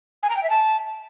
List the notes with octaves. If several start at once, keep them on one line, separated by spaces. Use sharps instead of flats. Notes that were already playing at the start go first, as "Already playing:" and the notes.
G#5
A#5
G5
E5
A5